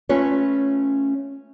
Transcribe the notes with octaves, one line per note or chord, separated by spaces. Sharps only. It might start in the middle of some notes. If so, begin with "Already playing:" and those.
A3 C#4 F4 B4 C#5